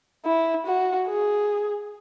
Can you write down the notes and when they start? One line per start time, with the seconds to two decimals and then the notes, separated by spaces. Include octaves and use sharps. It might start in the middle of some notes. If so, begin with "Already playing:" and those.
0.25 E4
0.67 F#4
1.09 G#4